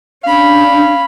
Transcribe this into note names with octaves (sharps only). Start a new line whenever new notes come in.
C#4 D4 F5 B5